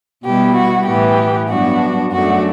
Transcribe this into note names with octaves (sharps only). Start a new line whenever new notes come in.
B2 G3 B3 E4 G4
F#4
A2 E3 B3 G4
G2 F#3 B3 D4 F#4
F#2 F#3 A3 D4 F#4